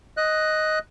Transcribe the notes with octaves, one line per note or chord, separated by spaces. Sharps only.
D#5 F#6